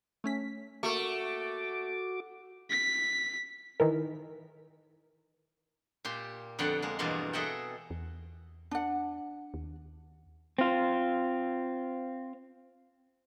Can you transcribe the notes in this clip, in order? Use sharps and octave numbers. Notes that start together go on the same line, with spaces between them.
A3 C#4 B6
A3 A#3 F#4 C#6 D6
B6
D#3 E3 A#4
A#2 G4 C6
F2 D3 B3 F#5 G5 C6
G#3 A#3
E2 G2 B2 A#3 D5 C6
G#4 A4 D#5 E5 F#5 G5
E2
D4 F#5
D#2
C4 F4